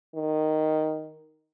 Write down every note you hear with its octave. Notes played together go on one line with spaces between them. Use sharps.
D#3